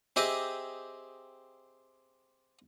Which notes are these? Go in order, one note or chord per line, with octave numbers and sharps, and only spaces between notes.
C4 G4 G#4 D#5 E5 D6